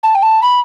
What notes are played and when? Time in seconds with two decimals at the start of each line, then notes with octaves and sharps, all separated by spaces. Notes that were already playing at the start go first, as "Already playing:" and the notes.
0.03 A5
0.15 G5
0.22 A5
0.42 B5